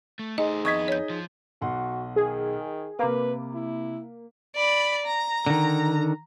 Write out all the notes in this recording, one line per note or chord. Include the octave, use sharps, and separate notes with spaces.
A3
A3 D#4 G#4 C5 D#5
F2 B3 D#5 C#6 G#6 B6
C#5 G6
F3
B1 F#4 F#5 C6
D#3 G#4
C3 A#3 B4 B5 D6
E4
D5 B5
A#5
D3 D#3